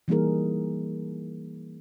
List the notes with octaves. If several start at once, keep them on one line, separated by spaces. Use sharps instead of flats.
E3 G3 A#3 D#4 G#4 A#4